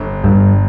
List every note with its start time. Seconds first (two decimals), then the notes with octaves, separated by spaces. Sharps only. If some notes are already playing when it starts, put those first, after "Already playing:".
Already playing: G1
0.24 G1 G2